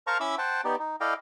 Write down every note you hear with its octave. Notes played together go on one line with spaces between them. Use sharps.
A#4 C5 F5 A5 A#5 C#6
C#4 E4 E5 B5 D6 E6
C5 F#5 G5 A5
B3 D#4 G4 D5
D#4
E4 A4 D5 D#5 F5 G5